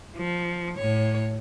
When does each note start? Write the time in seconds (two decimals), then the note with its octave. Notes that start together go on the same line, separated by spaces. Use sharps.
0.17 F3
0.77 A2 C#5